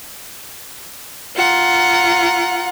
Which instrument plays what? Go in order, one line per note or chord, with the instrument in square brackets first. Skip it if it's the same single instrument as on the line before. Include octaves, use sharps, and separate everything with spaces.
[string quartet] F4 F#5 A#5